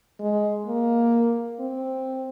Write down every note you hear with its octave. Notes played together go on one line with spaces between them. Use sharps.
G#3
A#3
C4